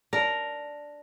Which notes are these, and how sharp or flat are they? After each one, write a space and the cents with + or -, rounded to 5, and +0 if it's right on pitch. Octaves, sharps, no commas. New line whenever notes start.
D4 +0 A#4 +0